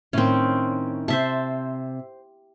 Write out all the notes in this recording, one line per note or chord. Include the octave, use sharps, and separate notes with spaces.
A2 D#3 C4 C#4
C3 C5 E5 A5